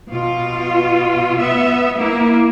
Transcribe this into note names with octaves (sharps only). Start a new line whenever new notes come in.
B2 F4
B3 E5
A#3 E4